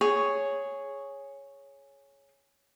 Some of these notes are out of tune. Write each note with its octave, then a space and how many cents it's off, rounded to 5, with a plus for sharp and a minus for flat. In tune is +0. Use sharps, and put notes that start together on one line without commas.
G#4 +0 C#5 +0